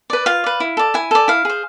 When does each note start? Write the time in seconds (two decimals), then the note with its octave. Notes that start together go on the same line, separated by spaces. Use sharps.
0.10 B4 D5
0.26 F4 F5
0.44 B4 D5
0.60 E4
0.77 A4 D5
0.94 E4 G#5
1.11 A4 D5
1.28 E4 F5
1.45 G#4 C5